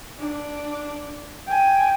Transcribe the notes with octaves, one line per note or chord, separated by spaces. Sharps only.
D4
G5 G#5